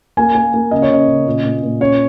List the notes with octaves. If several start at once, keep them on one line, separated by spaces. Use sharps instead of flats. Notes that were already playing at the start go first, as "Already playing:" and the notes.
A#3 G#5
A#3 G#5
A#3
C#3 D#5
C#5
C#3 D#5
C#3
A#2
A#2
A#2
C#4 C#5